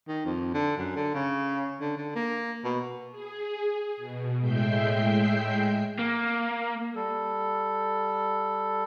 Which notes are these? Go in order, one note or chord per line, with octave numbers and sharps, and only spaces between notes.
D#3
F2
D3
F#2
D3
C#3
D3
D3
A#3
B2
G#4
B2
A2 G#3 E5 G5 G6 C7
A#3
G3 A4